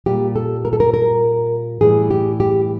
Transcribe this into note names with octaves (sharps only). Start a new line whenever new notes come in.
A#2 G3 G4
A4
A#4
A4
A#4
A#4
A2 E3 G3 G#4
G4
G4